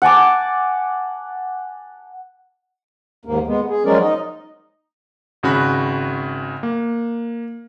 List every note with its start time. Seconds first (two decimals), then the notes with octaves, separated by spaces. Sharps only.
0.02 F#5 G#5 A5 D6
3.25 D#2 G#2 A#3
3.47 G#3 B3
3.69 G#4
3.85 F3 F#3 G#3 C#4 A#4 D5
4.01 D#4 D#5
5.43 G#1 C#3 F#4 B5 F#6
6.63 A#3